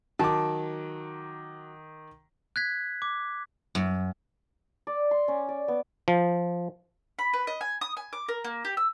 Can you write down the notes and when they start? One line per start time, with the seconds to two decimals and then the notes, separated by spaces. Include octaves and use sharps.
0.19 D#3 F#3 A5 D6
2.56 F#6 G#6 B6
3.02 D6
3.75 F#2
4.87 D5
5.11 C6
5.28 C#4
5.49 D5
5.68 B3
6.08 F3
7.19 B5
7.33 B4
7.47 D#5
7.61 G#5
7.81 D#6
7.97 G#5
8.13 D6
8.28 A#4
8.44 A#3
8.65 G4
8.77 E6